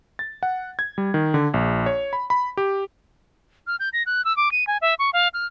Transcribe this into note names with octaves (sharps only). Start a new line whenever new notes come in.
A6
F#5
G#6
G3
D#3
D3
A#1
C#5
B5
B5
G4
F6
G6
A#6
F#6
E6
D6
D#7
G#5
E5
C#6
F5
F6